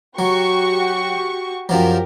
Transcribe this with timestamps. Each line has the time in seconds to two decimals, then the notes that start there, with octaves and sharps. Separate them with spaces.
0.19 F#3 F#4 G4 C#6
1.69 F#2 F3 F#3 G4 A#4